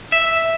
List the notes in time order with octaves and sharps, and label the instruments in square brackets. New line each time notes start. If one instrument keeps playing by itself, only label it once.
[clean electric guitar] E5